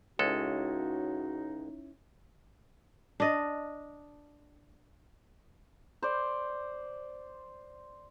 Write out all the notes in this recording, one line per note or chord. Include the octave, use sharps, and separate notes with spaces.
C#2 G#3 C#4 D#4 E4 F#4 A4 C#5
D4 D#5
C5 D5